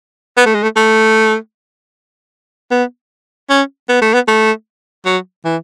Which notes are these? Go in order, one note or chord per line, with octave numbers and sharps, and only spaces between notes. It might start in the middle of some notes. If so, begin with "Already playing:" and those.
B3
A3
G#3
A3
A3
B3
C#4
B3
A3
B3
A3
F#3
E3